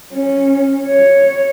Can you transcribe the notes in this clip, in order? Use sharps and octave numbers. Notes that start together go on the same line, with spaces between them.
C#4
C#5